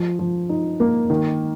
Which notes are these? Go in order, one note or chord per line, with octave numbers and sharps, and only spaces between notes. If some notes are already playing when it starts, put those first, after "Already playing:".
Already playing: F3
F3
D#4
A#3
D#3